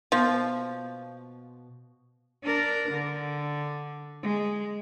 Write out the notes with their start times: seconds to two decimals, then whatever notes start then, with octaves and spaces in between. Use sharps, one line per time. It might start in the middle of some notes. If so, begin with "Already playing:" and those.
0.12 B2 F3
2.43 D4 A#4
2.91 D3
4.23 G#3